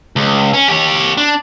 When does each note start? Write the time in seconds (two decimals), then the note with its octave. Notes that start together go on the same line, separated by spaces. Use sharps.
0.16 C#2
0.53 C#4
0.69 G4 C#5
1.17 D4